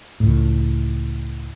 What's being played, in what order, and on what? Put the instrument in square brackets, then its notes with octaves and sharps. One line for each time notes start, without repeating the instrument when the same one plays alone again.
[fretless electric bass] C#2 A2